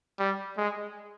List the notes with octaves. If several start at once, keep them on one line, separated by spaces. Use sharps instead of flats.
G3
G#3